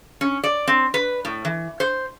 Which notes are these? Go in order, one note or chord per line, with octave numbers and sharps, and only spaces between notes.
C#4
D5
C4
B4
A2
E3
C5